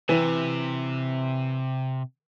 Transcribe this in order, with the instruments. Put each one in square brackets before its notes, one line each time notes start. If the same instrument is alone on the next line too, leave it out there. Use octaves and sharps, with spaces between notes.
[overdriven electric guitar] C3 [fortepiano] E3